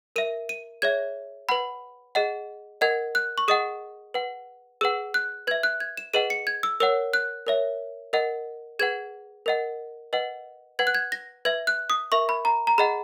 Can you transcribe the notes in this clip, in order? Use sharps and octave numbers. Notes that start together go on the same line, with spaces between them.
A#4 E5 D#7
D#7
G#4 C#5 E5 G#6
B4 F#5 B5
G#4 D#5 F#5
A#4 D#5 F#5 G#6
F#6
C#6
G#4 D#5 F#5 D#6
B4 F#5
G#4 B4 F#5 E6
F#6
B4 E5 G#6
F#6
G#6
E7
G#4 B4 D#5 F#5 D#7
C#7
G#6
E6
A#4 C#5 F#5 E6
F#6
A#4 C#5 E5
A#4 D#5 F#5
G#4 B4 F#5 G#6
A#4 D#5 F#5
B4 D#5 F#5
B4 F#5 G#6
F#6
G#6
A#6
B4 E5 G#6
F#6
D#6
A#4 E5 C#6
B5
A#5
A#5
G#4 D#5 F#5 B5